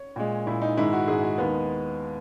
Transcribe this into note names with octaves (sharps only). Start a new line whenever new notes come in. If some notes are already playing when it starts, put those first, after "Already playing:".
Already playing: C#5
A#2 G#3
A#2 G#3 E4
D#4
G#2 D#3 G#3 E4
F#4
G#2 D#3 G#3 G#4
F#4
D#2 D#3 G#3 B3